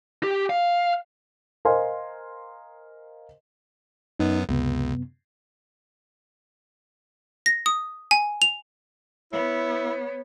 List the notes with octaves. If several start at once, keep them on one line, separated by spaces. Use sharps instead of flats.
G4
F5
A#4 C5 D#5 F5 G#5 C6
F#2 B3 D#4
C#2 F#2 C3 B3
A#6
D#6
G#5
F7
B3 E4 C#5